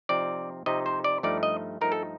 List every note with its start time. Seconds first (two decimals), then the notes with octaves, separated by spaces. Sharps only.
0.09 C3 F3 C4 D#4 D5
0.66 C3 F3 C4 D#4 D#5
0.86 C5
1.04 D5
1.23 G2 F3 A3 D#4 D5
1.43 D#5
1.81 G2 F3 A3 D#4 A#4
1.92 A4